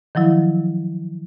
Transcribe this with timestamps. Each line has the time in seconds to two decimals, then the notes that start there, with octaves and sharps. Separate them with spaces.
0.15 D#3 F3 F#3 E4